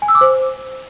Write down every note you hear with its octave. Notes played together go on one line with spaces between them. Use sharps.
G#5
E6
D6
C5